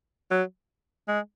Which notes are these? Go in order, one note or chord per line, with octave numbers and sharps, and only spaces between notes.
F#3
G#3